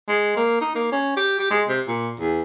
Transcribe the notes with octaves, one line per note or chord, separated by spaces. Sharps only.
G#3
A#3
D#4
A#3
C#4
G4
G4
G#3
C3
A#2
E2